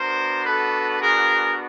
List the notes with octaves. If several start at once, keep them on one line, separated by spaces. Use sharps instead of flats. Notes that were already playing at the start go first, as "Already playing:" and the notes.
Already playing: B3 D4 F#4 A#4 C5
A4 B4
G#4 A#4